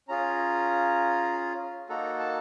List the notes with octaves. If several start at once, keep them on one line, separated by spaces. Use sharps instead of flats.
C#4 F4 G#4 A#5
A#3 D#4 F#4 A4 A#5
A5